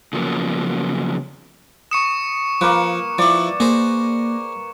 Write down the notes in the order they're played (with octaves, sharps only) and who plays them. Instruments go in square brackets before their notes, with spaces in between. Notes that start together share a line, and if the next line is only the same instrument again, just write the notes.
[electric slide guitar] C#3 F3 F#3 A#3 B3
[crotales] C#6 C#7 E7 [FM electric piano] D#6
[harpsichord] F3 [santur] A#3 B4
[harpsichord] F3 E4 [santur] D5
[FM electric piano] A#3 [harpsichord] G#4 C5